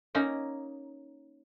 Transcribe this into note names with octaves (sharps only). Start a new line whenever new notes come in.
A#3 C#4 D#4